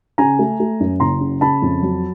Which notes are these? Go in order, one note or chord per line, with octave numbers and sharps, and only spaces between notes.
C#3 G#5 A#5
A3
A3
F#2
F#1 A#5 C6
C#3
C#3 A5 B5
F2
F#3